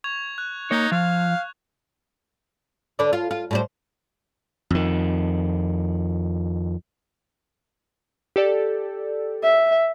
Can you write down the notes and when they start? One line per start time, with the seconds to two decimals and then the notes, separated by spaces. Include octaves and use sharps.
0.04 C#6 G#6 F7
0.38 F#6
0.71 A#3 D#4 C#5
0.92 F3 F5
2.99 D3 B4 D5
3.13 F4
3.31 F4
3.51 A2 G3 C5
4.70 F2 D#3
8.36 G4 A4 D5
9.43 E5